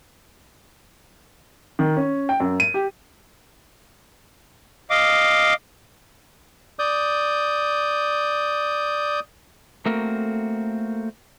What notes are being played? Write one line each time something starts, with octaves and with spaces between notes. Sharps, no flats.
D#3
C#4
G5
F#2
D#7
G4
D#5 F5 D6
D5 D#6 G6
A3 A#3 C4 F#4 A4 A#4